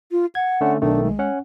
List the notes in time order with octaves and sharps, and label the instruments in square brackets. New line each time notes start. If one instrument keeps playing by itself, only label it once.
[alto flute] F4
[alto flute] F#5 [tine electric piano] G#6
[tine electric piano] D3 A3 C#4
[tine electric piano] B1 D#3 A3 [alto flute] D4
[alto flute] G#3
[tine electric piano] C#4 F#5